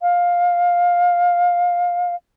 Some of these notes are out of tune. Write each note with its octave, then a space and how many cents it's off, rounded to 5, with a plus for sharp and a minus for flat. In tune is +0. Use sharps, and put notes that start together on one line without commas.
F5 +15